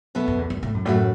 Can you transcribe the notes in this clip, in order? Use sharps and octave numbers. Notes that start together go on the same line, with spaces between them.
B2 B3 A4 E5
F#2
E2
F#2
A2
F#2
F#2 A2 E3 A3 F#4